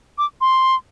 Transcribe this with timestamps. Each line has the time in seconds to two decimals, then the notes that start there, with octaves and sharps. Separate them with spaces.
0.18 D6
0.41 C6